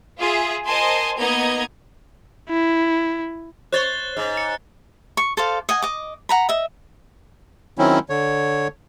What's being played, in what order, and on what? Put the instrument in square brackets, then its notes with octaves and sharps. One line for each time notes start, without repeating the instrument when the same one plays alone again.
[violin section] F4 G#4 E5
A#4 C5 D#5 G#5 A5 C6
A#3 B3 D#4 D#5 A#5 G#6
[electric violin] E4
[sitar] C5 C#5 [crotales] F#6 A6 G7
[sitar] G#2
[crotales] C#7
[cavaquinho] C#6
A4 C5 D5 F5
D#5 F#5 G#5
D#5 D6
F#5 A#5 B5
D#5 E5
[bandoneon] D#3 F#3 C4 C#4 E4
D3 C#5